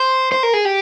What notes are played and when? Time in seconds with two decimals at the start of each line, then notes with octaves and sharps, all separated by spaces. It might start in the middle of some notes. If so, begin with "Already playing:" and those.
Already playing: C5
0.32 C5
0.43 A#4
0.54 G#4
0.65 G4